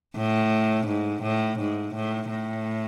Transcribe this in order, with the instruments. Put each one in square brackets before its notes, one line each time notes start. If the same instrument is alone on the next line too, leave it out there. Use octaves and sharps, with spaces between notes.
[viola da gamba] A2
G#2
A2
G#2
A2
A2